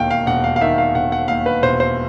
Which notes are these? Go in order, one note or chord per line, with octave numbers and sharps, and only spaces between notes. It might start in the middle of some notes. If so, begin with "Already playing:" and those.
Already playing: E1 D#2 F5 G5
F5
E1 F#5
F5
F5
D#3 E5
F5
E1 F#5
F#5
D#2 F5
B4
E1 C5
C5